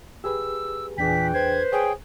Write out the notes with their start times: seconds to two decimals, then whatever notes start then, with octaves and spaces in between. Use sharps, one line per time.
0.24 G4 G#4 B4 E6
0.98 E2 A#2 E3 D4 G#4 G5 B6
1.34 B4 C5 G#6
1.73 G#4 C#5 G5